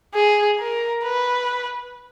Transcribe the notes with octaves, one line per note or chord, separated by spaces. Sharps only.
G#4
A#4
B4